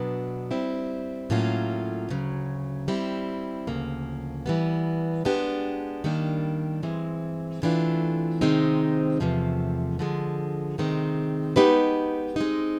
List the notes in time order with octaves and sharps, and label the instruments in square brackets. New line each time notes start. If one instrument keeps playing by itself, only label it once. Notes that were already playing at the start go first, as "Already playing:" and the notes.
Already playing: [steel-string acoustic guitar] B2 F#3 B3 D4
G3 C4 E4
A2 F#3 A#3 C#4 F4
D2 C#3 F#3
G3 C4 E4
D2 C#3 F3 A#3
E3 G3 B3
G#3 B3 D4 G4
D#3 G3 A#3 D4
G2 E3 G#3 C4
C3 E3 A3 D4 F4
C3 D#3 G#3 C4 D#4
E2 C3 F3 A3
D3 F3 G#3
C3 D#3 G#3 C4
G#3 B3 D#4 G4 B4
G#3 C4 D#4